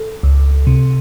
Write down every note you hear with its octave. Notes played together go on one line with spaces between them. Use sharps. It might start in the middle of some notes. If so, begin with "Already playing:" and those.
Already playing: A4
C#2
C3